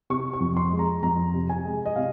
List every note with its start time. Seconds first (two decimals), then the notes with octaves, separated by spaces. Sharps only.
0.10 C3 C#6
0.33 C#6
0.40 F2
0.57 C6
0.72 G#3
0.79 A#5
1.02 F2 A#5
1.34 C3
1.49 G#5
1.65 G#3
1.86 D#5
1.96 C3 F5